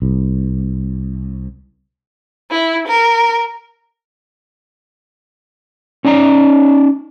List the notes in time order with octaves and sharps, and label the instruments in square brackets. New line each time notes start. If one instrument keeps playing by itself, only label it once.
[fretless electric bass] C2
[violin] E4
A#4
[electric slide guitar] C#4 D#4 D5 A#5